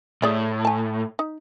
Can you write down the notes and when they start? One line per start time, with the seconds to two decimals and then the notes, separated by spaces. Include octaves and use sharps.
0.22 A2 G#4 D5 E5
0.65 G#5 A5
1.19 D#4